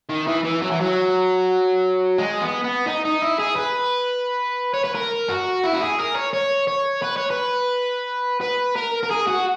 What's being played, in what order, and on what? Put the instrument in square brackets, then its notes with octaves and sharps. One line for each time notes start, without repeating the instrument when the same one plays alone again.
[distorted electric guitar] D#3
E3
E3
F#3
E3
F#3
G#3
B3
B3
D#4
D#4
E4
G#4
B4
C#5
B4
A#4
F#4
E4
F#4
G#4
A#4
C#5
C#5
C#5
B4
C#5
B4
B4
A#4
A#4
G#4
F#4